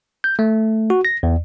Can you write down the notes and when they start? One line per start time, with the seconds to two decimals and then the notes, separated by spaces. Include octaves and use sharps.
0.24 G6
0.39 A3
0.90 F#4
1.05 A#6
1.23 E2